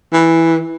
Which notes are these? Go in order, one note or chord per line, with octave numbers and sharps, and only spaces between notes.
E3